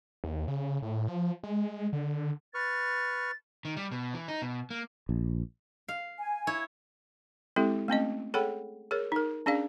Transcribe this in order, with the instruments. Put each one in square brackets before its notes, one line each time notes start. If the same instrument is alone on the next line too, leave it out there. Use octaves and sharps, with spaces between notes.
[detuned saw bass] D#2
C#3
A2
F3
G#3
D3
[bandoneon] B4 C#6 F6 [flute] A6
[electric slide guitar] D#3
G3
B2
E3
D#4
B2
A#3
[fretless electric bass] A#1
[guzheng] F5
[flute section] G#5
[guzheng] E4 C#5
[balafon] G#3 C4 E4 G4 A4
A3 C4 C#4 D#5
G#4 A4 C#5 F#5 G5 B5
G#4 A#4 C#5
D#4 A#4
C#4 D4 G#4 D5 F5